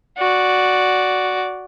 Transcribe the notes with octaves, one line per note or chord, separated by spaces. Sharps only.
F#4 D5